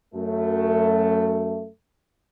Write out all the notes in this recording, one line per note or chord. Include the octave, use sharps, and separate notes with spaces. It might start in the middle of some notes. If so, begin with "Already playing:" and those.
F#2 A3